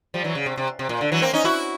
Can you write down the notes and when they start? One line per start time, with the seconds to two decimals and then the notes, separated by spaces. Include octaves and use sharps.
0.14 F3 G3
0.24 E3 F#3
0.35 C#3
0.46 C3
0.57 C3
0.79 C3
0.89 A#2
1.01 D3
1.12 E3 F#3
1.22 A#3 C4
1.33 C#4 D#4
1.44 E4 F#4